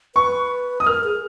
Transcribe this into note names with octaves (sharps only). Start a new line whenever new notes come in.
B4 C#6
D#6
A#4 F6
G#4